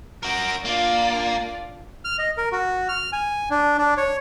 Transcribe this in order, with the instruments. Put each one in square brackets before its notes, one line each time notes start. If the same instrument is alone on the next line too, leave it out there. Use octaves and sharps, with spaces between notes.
[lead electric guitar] F#4 A#4 [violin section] A#6 D7
[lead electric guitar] A#3 [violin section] D4 F4 D5
[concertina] F6
D#5
A#4
F#4
F6
G#5
D4
D4
C#5